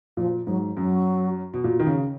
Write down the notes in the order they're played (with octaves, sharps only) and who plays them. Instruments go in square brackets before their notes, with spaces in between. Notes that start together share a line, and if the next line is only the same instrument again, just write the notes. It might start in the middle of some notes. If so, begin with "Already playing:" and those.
[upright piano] A#2 [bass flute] F3
[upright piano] G#2 [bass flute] F#3
[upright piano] F#2 [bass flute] F#3
[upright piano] B2
A#2
D#3
C#3